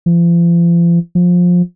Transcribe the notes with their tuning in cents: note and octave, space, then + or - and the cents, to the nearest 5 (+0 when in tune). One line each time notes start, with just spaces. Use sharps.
F3 -40
F3 +20